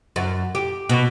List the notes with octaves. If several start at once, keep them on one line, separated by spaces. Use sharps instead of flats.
F#2
G4
B2